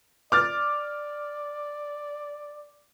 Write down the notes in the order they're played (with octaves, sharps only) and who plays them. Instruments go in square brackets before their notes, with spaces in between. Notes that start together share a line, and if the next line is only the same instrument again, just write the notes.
[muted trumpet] D5 [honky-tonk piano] D6 F6 A6